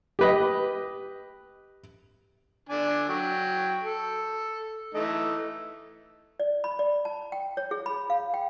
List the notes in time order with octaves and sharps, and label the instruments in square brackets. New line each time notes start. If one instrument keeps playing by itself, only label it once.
[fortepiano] G4 B4 D#5
[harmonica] D3 D4 G#5
F#3 G5
A4
E3 A3 D#4
[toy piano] D5
B5
D5
A5
G5
C#5
G#4
B5
F5
G5